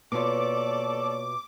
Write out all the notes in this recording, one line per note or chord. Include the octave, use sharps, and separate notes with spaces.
B2 A#3 F4 A4 C#5 D5 C#6 D6